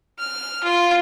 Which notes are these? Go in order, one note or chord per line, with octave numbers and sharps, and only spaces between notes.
F6
F4